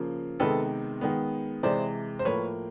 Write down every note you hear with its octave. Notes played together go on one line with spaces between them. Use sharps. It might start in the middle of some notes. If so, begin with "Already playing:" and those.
Already playing: C#3 F3 A#3
C3 D#3 G#3 B3 A4 B4
D#3 G#3 B3
C3 E3 G#3 C5 D5
C5
A2 F3 A#3 B4 C#5